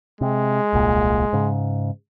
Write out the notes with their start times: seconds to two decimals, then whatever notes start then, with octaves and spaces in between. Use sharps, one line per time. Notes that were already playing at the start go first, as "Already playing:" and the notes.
0.21 C3 G#3
0.73 D#1 C2 A#2
1.33 G#2 C#3